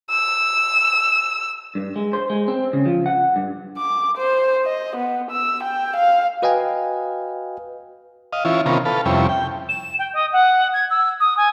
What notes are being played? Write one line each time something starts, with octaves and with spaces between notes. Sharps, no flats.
E6
G2
G#3
C5
G#3
C4
C#3
F3
F#5
G2
D6
C5
D#5
B3
E6
G5
F5
F#4 B4 D#5 F5 G5 G#5
D#5 F5
E3 C#4 E4 F4
C3 D#3 B3 C#4 F4 A#4
A4 B4 F5
F2 C3 G3 C#4 E4
G5
E7
G5
D#5
F#5
G#6
E6
D#6
G#5